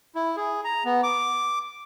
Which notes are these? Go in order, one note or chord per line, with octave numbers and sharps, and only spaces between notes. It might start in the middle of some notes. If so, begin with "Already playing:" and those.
E4
G#4
A#5
B3
D6